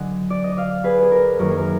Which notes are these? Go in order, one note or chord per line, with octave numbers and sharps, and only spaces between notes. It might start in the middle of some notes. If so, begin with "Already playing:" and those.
Already playing: D3 F#3 D4 D#5 F#5 G#5
D5
D#5
D5 F5
G#4 B4
G#4
A#4
F#2 D#3 A#3 A#4
G#4
A#4